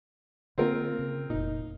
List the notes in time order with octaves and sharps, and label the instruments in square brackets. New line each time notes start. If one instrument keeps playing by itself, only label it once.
[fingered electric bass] D3 A#3 [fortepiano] C4 F4 A#4
[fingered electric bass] C#3
[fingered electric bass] F1 A#2 [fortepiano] D#4